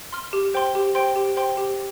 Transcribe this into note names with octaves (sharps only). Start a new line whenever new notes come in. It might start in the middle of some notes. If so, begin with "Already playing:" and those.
C6 F6
G4
C5 G5 C6
G4
C5 G5 C6
G4
C5 G5 C6
G4